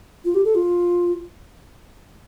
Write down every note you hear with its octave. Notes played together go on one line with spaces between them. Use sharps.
F4
G4
A4
F4